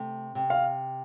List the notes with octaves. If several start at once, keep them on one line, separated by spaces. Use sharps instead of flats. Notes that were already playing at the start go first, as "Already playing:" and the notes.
Already playing: C3 A3
C3
F5